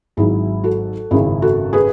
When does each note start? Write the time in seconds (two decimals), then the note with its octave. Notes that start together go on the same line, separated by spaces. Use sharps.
0.17 G#1 G#2 F#3 E4 G#4
0.64 F#4 A4
1.11 G#1 F#2 C#3 E4 G#4
1.42 F#4 A4
1.73 G#4 B4